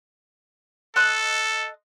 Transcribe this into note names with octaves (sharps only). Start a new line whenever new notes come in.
A4 D#5 C6 F#6